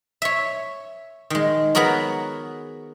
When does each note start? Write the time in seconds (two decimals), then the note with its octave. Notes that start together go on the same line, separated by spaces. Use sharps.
0.22 C#5 E5
1.30 D#3 G#3
1.75 B3 F#4 G#4 A#4 C#5